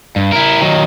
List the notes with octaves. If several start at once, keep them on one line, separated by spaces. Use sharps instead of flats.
G2
E4 A#4
D#3 F#3